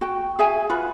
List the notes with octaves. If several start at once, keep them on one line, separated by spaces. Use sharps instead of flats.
F#4 G5
G#4 E5 G#5
F4 F#4 B4